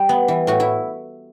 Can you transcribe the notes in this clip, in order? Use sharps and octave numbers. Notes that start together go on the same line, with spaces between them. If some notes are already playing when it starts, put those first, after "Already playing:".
Already playing: G3
B3
E3
A2 F#4
E4